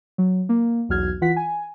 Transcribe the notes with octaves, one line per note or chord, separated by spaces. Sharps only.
F#3
A#3
B1 E2 F#4 F6 G#6
E3 F4 F#5 B6
G#5